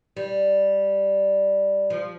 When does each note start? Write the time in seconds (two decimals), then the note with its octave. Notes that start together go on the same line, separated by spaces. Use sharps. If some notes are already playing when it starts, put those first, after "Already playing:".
0.17 G3
1.90 F3